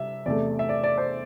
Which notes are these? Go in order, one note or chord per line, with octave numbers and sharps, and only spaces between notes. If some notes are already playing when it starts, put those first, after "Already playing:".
Already playing: C3 G3 E5
E2 C3 A3 D5
E5
D5
D5
C5